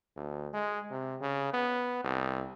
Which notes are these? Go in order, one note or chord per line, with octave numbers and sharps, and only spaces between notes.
D2
G#3
C3
C#3
B3
C2